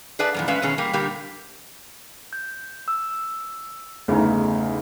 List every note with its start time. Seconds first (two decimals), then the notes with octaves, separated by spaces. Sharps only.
0.19 G#4 B4 D5 E5 A5
0.34 F#2 A#2 E3
0.48 G#3 C#4 B4 E5 F5
0.62 B2 D#3 C#4 G#4
0.78 G3 A#3
0.93 A#2 D3 G3 A#3 G4
2.33 G6
2.88 E6
4.08 G1 E2 C#3 A3 D#4